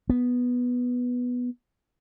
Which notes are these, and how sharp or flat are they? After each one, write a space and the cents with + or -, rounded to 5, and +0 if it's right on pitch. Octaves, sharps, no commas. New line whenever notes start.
B3 -5